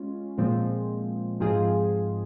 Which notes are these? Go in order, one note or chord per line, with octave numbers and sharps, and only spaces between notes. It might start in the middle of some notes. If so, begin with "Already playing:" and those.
Already playing: G#3 C#4 F4
A#2 F3 G#3 C4
G#2 F3 C4 F4 G#4